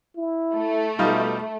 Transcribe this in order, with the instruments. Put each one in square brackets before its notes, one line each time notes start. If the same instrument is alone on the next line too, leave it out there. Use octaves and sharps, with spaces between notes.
[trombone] E4
[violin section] A3
[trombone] B2 [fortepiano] G3 D#4 F4